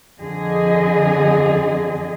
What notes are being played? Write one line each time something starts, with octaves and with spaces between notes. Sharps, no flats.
F2 D3 G#4 D#5